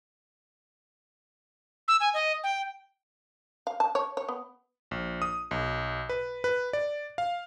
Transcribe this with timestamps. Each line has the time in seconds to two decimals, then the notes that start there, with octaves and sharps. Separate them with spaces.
1.88 E6
2.00 G#5
2.14 D#5
2.44 G5
3.67 F5
3.80 A5
3.95 C#5
4.17 C#5
4.29 B3
4.91 A#1
5.22 D#6
5.51 B1
6.09 B4
6.44 B4
6.73 D5
7.18 F5